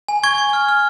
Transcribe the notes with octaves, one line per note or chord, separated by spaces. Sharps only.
G#5
C#6 G#6
C#6
F6
F6